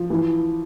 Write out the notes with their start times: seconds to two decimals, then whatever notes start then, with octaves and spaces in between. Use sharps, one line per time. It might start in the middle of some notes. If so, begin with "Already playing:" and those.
Already playing: F3
0.10 E3